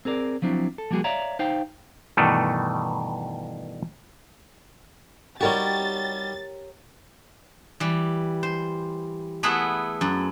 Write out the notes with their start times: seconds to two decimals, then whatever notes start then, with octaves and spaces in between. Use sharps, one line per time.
0.05 C4 G#4 A#4 D5
0.42 F3 F#3 C4 D4 E4
0.78 A4
0.91 F3 G3 A#3 F#4 G#4
1.04 C#5 D5 E5 F5 A#5
1.39 D#4 C5 F5 G5
2.17 G2 B2 D#3 E3 A3
5.41 G3 D#4 F#4 G4 A#4 C#5 A6
7.80 E3 G3
8.43 C5
9.43 A3 B3 E4 G#4 B4 F#5
10.01 F#2